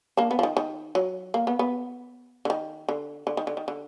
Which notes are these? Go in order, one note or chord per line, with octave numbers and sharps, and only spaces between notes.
A#3 D4
B3
F3
D#3
D#3
F#3
A#3
B3
B3
D3
D#3
D3
D3
D#3
D3
D#3
D3